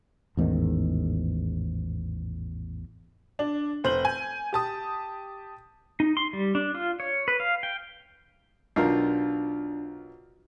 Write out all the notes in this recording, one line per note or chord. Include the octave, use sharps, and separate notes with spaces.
A1 E2 G#2 D#3
D4
F1 C5 G6 F#7
G#5
G4 A5 D#6
D#4
C6
G3
D4
F4
C#5
B4
F5
G5
B1 D4 F4 A#4